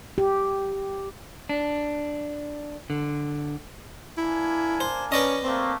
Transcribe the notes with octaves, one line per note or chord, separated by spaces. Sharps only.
G4
D4
D3
A#3 D4 E4 G#5
C5
C#4 B4 D5 D#5
A3 A#3 C4